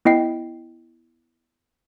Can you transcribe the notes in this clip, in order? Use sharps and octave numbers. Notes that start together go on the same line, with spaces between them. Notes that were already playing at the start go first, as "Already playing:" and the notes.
B3 E4 D#5 G5 C7